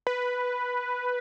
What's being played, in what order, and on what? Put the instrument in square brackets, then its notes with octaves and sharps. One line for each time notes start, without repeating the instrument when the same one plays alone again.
[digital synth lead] B4